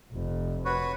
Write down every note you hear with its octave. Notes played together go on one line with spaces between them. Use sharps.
F1
F#4 B4 C#5